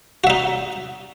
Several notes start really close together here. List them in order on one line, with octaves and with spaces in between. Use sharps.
F#4 E5 D#4